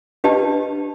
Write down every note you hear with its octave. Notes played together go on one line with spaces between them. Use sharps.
D4 G4 B4 D#5 A5